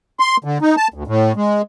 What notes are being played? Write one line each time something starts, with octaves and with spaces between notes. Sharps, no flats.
C6
D3
D#4
A5
D2
A2
G#3